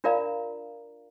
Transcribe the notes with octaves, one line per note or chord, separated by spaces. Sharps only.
D4 F4 A#4 D5 F5 A#5